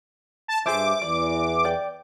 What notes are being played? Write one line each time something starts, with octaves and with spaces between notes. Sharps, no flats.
A5
G2 G#4 C5 E5 D6
E2 E3 D5
D5 G5